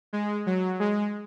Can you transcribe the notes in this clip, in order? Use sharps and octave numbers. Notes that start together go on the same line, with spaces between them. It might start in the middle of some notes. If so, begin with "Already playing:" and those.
G#3
F#3
G#3